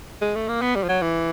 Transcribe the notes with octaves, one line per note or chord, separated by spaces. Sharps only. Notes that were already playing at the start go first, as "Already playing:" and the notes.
G#3
A3
A#3
B3
G3
F3
F#3
E3